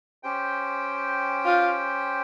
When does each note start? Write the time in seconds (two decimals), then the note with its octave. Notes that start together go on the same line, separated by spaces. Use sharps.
0.23 C#4 G4 C5 G5
1.45 F4